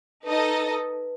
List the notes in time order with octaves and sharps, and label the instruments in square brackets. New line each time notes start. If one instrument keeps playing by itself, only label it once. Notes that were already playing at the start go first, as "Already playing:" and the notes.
[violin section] D#4 A4 D#5 [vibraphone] B4